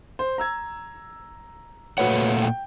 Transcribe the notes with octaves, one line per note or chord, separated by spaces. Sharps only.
C5
A#5 E6 G#6
A#2 A3 F#4 B4 C#5 F#5
G5